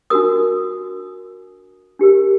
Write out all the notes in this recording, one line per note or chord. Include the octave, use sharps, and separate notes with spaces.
D4 F#4 A#4 D#6
D4 G4 A#4